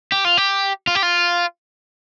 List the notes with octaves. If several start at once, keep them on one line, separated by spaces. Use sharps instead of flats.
G4
F4
G4
F4
G4
F4